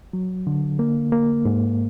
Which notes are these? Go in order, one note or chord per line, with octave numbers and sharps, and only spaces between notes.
F#3
D3
A#3
A#3
G#2